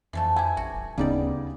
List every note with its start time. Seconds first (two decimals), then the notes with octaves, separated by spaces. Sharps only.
0.13 F2 E3 F3 A3
0.36 E4 G4 G#5
0.57 A1 F#4
0.73 D#1
0.98 D2 C#3 G3 B3 D#4 G4 D5